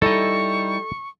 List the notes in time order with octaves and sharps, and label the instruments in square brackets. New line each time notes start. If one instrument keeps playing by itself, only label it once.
[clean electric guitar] G3 D#4 E4 [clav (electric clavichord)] A4 D#5 [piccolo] C#6